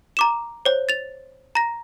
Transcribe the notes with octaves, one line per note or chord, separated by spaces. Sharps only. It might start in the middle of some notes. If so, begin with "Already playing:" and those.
A#5 D6 E7
C5 C#5
A6 F7
A#5 A#6